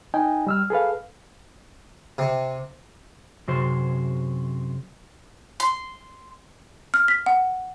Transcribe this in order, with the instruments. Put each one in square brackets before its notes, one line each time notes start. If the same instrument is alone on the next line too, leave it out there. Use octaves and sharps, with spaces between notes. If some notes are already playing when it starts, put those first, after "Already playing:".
[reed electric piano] D#4 D#5 G5 G#5
G3 E6 F6
G#4 A4 B4 F5
[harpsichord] C3
[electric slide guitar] F#2 C3 F#4 G#4 C5
[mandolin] C6
[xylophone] F6
B6
F#5